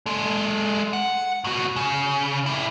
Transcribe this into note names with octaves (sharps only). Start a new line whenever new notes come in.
G#3 A4
F#5
A2 F#4
C#3
E4 G4